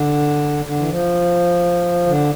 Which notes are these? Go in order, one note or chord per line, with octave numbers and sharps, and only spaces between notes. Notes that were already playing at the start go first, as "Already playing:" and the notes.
Already playing: D3
D3
E3
F3
D3